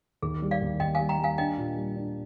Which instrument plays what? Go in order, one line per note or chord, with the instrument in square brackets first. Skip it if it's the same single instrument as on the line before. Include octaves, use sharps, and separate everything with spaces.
[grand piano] D#2 [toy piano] G#4
[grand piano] G3
[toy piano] D5 F5
[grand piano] D#2
[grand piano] D#2 [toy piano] D#5 G5
[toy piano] F5 G#5
[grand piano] G3
[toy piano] G5 A#5
[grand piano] G3
[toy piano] F5 G#5
[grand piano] D4 [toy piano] D#5 G5
[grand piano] A#2
G3
D4